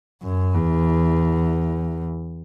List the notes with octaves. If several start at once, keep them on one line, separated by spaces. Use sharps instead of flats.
F#2
E2